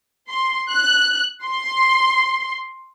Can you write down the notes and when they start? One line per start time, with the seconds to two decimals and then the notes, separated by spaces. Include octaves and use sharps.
0.29 C6
0.70 F#6
1.44 C6